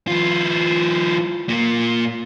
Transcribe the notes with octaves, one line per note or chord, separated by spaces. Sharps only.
E3 F4
A#2 A#3